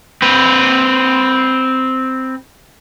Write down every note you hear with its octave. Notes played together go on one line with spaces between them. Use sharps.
C4 B4